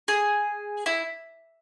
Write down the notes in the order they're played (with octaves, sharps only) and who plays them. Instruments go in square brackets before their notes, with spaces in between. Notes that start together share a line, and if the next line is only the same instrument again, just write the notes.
[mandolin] G#4
E4